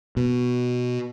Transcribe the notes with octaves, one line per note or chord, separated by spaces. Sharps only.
B2